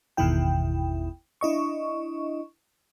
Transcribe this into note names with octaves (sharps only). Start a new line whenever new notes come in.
G#1 E2 B2 D#3 E4 G5
D4 E4 D#5 C#6